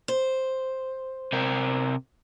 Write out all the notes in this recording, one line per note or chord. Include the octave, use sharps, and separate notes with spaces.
C5
C3 A#4